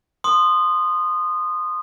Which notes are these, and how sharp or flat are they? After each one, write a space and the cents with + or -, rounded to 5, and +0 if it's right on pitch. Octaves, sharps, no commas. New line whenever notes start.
C6 +0 D#6 -20